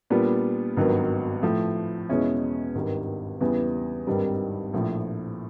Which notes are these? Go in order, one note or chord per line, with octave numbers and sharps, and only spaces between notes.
A#2 G3 B3 D4 F4
G#1 G2 D#3 F#3 B3
A2 F3 A3
E2 B2 G#3 C#4 E4
G#1 G2 D#3 G3
E2 C#3 E3 G3 B3
G#1 G2 D#3 G3 C4
A#1 A2 F3